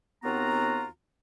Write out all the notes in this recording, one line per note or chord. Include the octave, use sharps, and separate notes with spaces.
D#2 B3 C4 F4 F#4 A#5